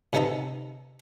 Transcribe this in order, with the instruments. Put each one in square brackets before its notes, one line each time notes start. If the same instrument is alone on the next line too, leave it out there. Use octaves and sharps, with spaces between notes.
[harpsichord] A2 C3 B3 D#4 A4 A#5